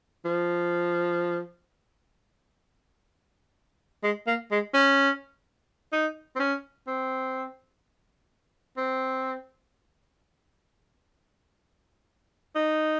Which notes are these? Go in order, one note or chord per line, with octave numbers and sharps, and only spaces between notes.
F3
G#3
A#3
G#3
C#4
D#4
C4
C#4
C4
C4
D#4